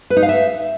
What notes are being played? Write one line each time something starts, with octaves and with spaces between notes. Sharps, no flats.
B4
D#4
F5
E5